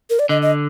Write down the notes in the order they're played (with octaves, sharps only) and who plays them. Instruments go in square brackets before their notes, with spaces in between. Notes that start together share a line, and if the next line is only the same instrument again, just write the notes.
[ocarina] A#4
D5
[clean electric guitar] D3 [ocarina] D#5
[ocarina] D#5